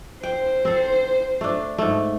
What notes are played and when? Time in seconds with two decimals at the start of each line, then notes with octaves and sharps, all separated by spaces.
0.23 C5 G5
0.65 C4 A4
1.41 A3 D4
1.78 G#2 A3